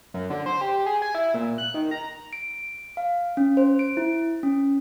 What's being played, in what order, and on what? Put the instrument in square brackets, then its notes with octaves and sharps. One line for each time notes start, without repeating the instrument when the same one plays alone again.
[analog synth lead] F#2
D3
C5
G4
G#4
G#5
E4
A#2
F#6
D#3
A#5
[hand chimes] D7
F5
C#4
C5
D7
E4
C#4